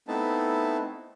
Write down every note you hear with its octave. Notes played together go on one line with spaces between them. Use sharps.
A3 B3 C4 D#4 E4 A5